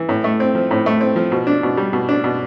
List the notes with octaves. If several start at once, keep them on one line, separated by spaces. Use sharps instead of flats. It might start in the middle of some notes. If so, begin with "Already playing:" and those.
Already playing: E3
A2
A3
C4
F3
A2
A3
C4
F3
B2
D4
B2
G3
B2
D4
B2